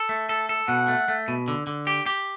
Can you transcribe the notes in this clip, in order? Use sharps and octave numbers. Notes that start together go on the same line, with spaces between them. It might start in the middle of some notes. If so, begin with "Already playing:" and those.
Already playing: A4
A3
A4
A4
B2 F#5
A3
A3
B2
D3
D3
G4
G4